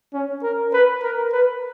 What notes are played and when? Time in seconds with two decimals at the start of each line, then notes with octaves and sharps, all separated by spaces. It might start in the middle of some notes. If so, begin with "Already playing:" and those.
0.14 C#4
0.43 A#4
0.73 B4
1.03 A#4
1.32 B4